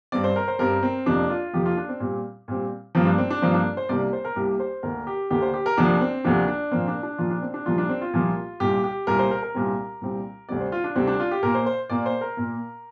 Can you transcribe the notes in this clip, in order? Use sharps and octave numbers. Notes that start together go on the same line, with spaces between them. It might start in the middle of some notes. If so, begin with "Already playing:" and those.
G2 G3 C4 D5
C5
A#4
C5
G2 G3 C4 A#4
C4
F2 C3 F3 A#3 D4
F4
F2 C3 F3 A#3 G4
F4
D4
C4
A#2 G3 C4
A#2 G3 C4
G2 F3 A#3 C4
D4
C4
D4
G2 F3 A#3 C4
D4
C5
C2 C3 A#3 D5
C5
A#4
C2 C3 A#3 G4
C5
D2 D3 A#3 A#4
G4
D2 D3 A#3 G4
C5
G4
A#4
D2 C3 F3 A#3 D4
C4
D2 C3 F3 A#3 D4
D4
A#2 F3 A#3 C4
D4
D4
A#2 F3 A#3 F4
D4
C4
D4
C2 A#2 F3 A#3 F4
D4
C4
F4
C2 A#2 F3 A#3
C2 A#2 G3 G4
G4
C2 A#2 G3 A#4
C5
A#4
A#4
C2 A#2 G3 C4
C2 A#2 G3 C4
D2 C3 G3 C4 D5
C5
F4
D4
D2 C3 G3 C4
D4
F4
G4
A#2 A#3 A#4
C5
C5
A#2 A#3 D5
C5
A#4
A#2 A#3